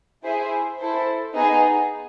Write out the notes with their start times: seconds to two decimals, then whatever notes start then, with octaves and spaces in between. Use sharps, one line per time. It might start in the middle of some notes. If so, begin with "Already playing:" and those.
0.23 E4 G#4 C5 E5
0.79 E4 A4 C5
1.35 B3 D#4 G#4